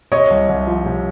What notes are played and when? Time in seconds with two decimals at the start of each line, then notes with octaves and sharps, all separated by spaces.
0.12 C3 C#5 D#5
0.30 C2
0.49 C2
0.67 F3
0.85 C3